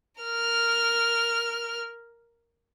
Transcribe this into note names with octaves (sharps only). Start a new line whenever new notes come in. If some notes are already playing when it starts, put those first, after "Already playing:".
A#4 F6